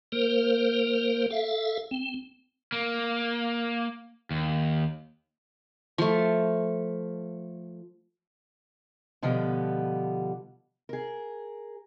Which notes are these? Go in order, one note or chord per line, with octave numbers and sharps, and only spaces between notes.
A#3 A#4 C5
A4 E5 F5
C4
A#3
D#2
F3 A3
B2 D3 F3 G3 B3
G#4 A#4